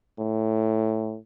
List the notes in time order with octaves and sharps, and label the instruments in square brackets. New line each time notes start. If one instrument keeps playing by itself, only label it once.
[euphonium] A2